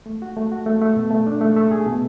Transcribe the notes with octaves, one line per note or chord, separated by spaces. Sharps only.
A3
F#4
A3
F#4
A3
A3
B2
A3
D4
A3
A3
G#4
B2